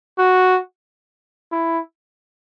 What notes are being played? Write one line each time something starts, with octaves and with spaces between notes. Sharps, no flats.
F#4
E4